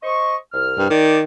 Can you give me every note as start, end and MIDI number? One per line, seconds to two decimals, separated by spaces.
0.03 0.36 72
0.03 0.36 75
0.03 0.36 85
0.53 0.90 36
0.53 0.90 89
0.78 0.87 43
0.90 1.23 51
0.90 1.18 74